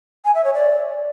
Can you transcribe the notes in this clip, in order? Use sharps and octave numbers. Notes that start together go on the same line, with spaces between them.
G#5
E5
C#5
D5